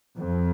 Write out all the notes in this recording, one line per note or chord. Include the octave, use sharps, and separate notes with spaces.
F2